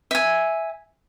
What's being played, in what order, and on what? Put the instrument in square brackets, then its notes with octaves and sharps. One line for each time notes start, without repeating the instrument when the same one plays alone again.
[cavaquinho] E5 G#5